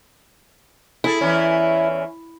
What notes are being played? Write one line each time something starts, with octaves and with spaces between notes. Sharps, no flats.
E4 G#4 A4
E2 E3 C#4